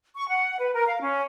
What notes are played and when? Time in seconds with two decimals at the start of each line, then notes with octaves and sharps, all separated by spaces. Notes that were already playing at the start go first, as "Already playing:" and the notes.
0.16 C#6
0.29 F#5
0.59 B4
0.74 A#4
0.87 F5
1.02 C#4